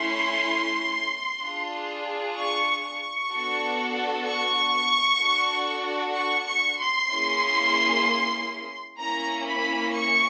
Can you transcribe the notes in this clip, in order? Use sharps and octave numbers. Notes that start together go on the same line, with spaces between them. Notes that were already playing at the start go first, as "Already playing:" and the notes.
Already playing: A3 C#4 E4 C6
D4 F4 G#4
C#6
C#6
B3 D4 F#4 A4
C#6
D4 F#4 A4
C#6
C#6
C6
A#3 C#4 E4 G#4
A#3 C#4 E4 A#5
B5
C#6